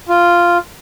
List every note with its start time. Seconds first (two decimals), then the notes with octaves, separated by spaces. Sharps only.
0.09 F4